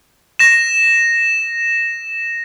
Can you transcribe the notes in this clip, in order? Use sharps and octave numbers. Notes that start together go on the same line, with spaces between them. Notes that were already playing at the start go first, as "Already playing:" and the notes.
A#6 E7